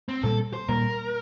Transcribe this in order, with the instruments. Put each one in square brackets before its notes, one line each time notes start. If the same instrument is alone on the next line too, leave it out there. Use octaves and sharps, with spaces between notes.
[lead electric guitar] C4
[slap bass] A#2 G3 A#3 [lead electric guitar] A4
[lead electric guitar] C5
[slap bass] A#2 G3 A#3 [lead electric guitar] A#4